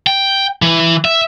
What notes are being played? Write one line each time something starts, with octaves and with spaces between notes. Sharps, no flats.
G5
E3
E5